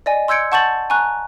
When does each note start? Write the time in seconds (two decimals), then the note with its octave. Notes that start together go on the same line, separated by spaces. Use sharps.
0.06 D5 D#5 G#5
0.28 C6 E6 G6 G#6 C#7 D7
0.52 F#5 A5 C#6 G6 A6 F#7
0.90 G#5 A#5 C#6 F#6